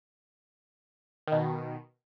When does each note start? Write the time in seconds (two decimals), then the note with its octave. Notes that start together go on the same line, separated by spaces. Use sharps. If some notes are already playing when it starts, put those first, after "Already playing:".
1.28 B2 D#3